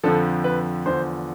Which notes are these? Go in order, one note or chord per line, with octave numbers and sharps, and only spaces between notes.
F2 D3 F3 A4
B4
E2 D3 F3 C5